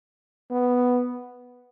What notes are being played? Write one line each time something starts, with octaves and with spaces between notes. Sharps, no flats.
B3